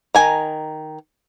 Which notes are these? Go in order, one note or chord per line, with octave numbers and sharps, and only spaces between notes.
D#3 G#5 A#5